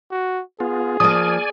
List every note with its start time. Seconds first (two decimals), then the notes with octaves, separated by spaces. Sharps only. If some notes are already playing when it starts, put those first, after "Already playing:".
0.11 F#4
0.60 B3 F4 G#4
1.00 F3 A#3 D5 G#5 D#6